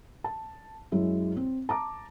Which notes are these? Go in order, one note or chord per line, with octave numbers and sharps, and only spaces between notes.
A5
F#2 F#3 G#3 E4
C4
A5 A#5 D6